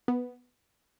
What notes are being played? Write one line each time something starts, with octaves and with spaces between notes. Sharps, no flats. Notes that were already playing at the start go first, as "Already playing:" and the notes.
B3